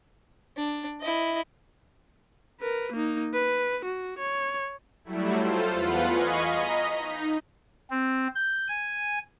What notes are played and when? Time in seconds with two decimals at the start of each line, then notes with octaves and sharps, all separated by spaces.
0.56 D4
1.01 E4 D#5
2.60 A#4 B4
2.93 A#3 D#4
3.33 B4
3.85 F#4
4.18 C#5
5.04 F#3 G3 A3 E4
5.40 F4 A4 C5
5.73 E2 F4 B4 F#5
6.08 D#5 F5 G#5 B5 C#6
6.48 D#5 A#5 B6
6.98 D#4
7.91 C4
8.35 G6
8.68 G#5